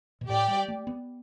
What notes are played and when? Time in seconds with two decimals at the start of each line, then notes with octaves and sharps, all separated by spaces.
0.21 B2
0.29 A2 G4 D5 G5
0.48 G3
0.68 A3
0.87 B3